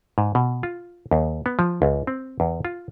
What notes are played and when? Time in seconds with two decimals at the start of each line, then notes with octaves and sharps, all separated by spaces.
0.18 G#2
0.35 B2
0.63 F4
1.11 D#2
1.46 B3
1.59 F3
1.82 C#2
2.07 C4
2.40 E2
2.65 F4